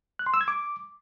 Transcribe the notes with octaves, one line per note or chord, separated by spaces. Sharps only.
F#6
C6
E6
G#6
D6